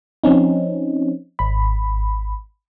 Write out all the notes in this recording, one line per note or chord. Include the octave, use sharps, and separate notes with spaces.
F3 C4 C#4 D#4
G#1 B5